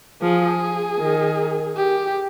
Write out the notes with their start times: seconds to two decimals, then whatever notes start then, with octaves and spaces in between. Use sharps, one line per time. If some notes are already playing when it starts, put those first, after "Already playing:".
0.22 F3 G#4
0.99 D#3
1.76 G4